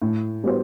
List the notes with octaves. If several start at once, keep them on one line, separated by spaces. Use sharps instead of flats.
A2
G3 B3 F#4 C5